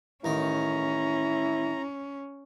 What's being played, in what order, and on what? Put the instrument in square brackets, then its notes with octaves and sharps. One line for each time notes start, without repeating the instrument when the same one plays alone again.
[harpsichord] A1 D#3 [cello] C#4 [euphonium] E4 [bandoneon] A#5